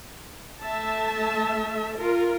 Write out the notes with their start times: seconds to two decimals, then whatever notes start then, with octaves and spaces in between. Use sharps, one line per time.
0.62 A3 E5 A5
1.97 F4 A#4